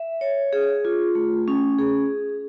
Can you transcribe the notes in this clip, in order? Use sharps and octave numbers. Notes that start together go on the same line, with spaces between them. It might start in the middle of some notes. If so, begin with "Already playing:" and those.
Already playing: E5
C#5
G#4
F4
A3
C#4
G#4